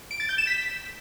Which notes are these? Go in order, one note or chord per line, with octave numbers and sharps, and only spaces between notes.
D7
A6
G6
E7
B6